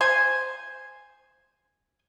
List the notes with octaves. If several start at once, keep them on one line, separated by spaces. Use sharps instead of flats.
C5 G#5